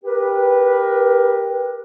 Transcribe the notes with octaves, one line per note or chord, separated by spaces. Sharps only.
G4 A#4 B4